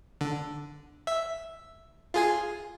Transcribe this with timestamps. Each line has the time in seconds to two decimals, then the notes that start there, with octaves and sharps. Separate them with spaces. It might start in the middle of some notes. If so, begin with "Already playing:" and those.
0.21 D3
1.07 E5
2.14 F4 G#4 G#5